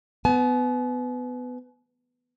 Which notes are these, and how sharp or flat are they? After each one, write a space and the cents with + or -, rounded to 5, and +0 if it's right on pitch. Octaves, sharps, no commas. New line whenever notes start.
B3 +20 G#5 +45